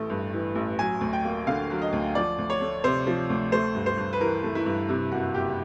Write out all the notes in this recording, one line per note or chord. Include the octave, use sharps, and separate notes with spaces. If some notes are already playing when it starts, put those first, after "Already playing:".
Already playing: A1 E3 A3
G2
E3
A1
F#3 G#5
D2
G5
A#3
D3 F5
F#3
D#5
D2
F3 D5
D2
C#5
A3
C3 C5
F3
D2
A3 C5
G2
C5
G2
B4
E3 A#4
A3
E4
G2
C3 E4
F#1 F#4
F#1 G4